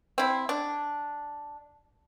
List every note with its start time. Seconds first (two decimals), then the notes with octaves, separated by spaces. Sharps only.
0.18 C4 E4
0.49 D4